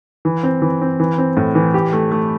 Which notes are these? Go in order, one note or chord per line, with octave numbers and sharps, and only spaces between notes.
E3
C4
E3
C4
E3
C4
A2
E3
G4
A3
A3